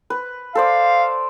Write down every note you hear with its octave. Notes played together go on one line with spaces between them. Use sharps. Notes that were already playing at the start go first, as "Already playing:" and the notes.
B4
A4 C5 D5 F5